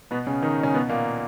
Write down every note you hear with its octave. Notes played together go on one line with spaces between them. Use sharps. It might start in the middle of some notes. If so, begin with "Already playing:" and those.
B2 B3
C#3 C#4
D#3 D#4
C#3 C#4
B2 B3
A#2 A#3